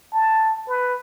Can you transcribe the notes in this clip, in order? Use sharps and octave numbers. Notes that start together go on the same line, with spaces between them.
A5
B4